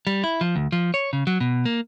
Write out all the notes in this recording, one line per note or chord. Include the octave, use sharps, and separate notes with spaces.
G3
E4
F3
D2
F3
C#5
C#3
F#3
B2
A#3